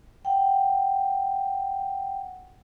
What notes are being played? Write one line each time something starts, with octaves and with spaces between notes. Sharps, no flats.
F#5 G5